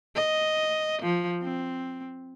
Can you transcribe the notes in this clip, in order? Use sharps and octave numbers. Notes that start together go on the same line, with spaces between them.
D#5
F3
C4